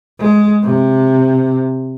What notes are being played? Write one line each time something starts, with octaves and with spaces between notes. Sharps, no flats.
G#3
C3